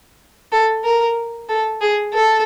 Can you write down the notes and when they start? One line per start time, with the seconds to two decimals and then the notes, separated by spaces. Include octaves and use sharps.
0.52 A4
0.84 A#4
1.49 A4
1.81 G#4
2.14 A4